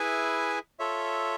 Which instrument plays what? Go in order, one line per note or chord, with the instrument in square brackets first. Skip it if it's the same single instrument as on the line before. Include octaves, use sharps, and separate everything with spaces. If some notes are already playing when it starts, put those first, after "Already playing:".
Already playing: [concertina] E4 G#4 B4 E5 G#5
F4 A4 C#5 E5